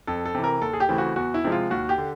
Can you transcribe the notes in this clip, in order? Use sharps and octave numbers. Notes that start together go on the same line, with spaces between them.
F2 A4
A4
C3 E3
A#4
D#2 A4
G#4
G4
C#3 E3 A3 C4
F#4
E2 F#4
E4
C3 F3 G#3
F4
D#2 F#4
G4
D3